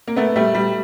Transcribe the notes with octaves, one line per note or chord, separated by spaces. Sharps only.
A#3
A3 B3
G3 A3
G3